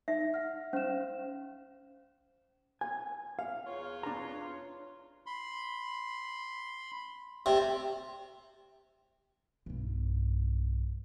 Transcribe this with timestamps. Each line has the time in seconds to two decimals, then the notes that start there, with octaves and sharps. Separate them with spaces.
0.08 D#4 E5
0.34 F#5 F6
0.73 C#4 C5 F5 E7
2.81 G#5
3.39 F5
3.66 E2 F4 C#5
4.03 D4 A#5
5.26 B5 C6
7.46 C3 A3 A4 D5
9.66 B1 G2